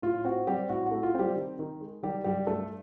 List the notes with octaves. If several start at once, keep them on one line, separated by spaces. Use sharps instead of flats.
A2 F4
C4 F#4
G3 C4 G4
A2 F#4
F#4
A3
F4
G3 C4 G4
D#3
D#3
G#3
D#3 G3 G4
G2 G3 G4
G2 A3 A4